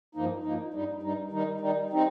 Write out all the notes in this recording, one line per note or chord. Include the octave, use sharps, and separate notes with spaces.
G2 F3 A#3 D#4
G2 F3 A#3 D#4
G2 G3 D#4
G2 G3 D#4
D#3 G3 D#4
D#3 G3 D#4
G3 C4 D#4